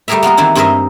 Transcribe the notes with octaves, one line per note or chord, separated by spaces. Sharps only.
G3 A3 G4 G#4 A#4 E5
A#3 B3 F4 A#4
D#3 E3 C4 D4 E4
G2 C4 G#4 A#4 D#5 E5